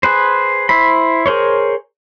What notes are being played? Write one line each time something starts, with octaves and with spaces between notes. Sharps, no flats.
G#4 B4 C5
E4 C5 B5
G#4 A#4 C5 C#5